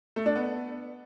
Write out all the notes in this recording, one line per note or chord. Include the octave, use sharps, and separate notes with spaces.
A3
D4
B3